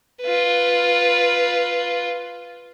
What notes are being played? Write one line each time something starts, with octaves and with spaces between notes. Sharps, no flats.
F4 B4